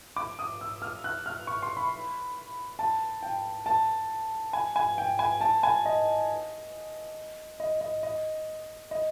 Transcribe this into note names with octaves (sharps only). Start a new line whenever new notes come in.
D6
D#6
E6
F6
F#6
F6
C#6
C6
B5
A5
G5
A5
G#5
G#5
G5
G#5
A5
G#5
D#5
D#5
D#5
D#5
D#5